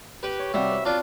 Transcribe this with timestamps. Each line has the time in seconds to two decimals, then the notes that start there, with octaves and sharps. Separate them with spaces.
0.23 G4 B4
0.39 C#5
0.54 C3 G3 F#4 E5 F5
0.71 B4
0.85 D4 F4